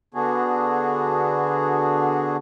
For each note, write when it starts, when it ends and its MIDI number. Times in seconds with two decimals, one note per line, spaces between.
0.14 2.37 50
0.14 2.37 59
0.14 2.37 62
0.14 2.37 66
0.14 2.37 68